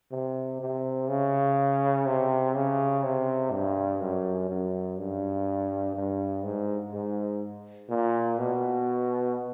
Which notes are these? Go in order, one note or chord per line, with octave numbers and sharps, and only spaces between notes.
C3
C3
C#3
C3
C#3
C3
G2
F#2
F#2
G2
G2
G#2
G#2
A#2
B2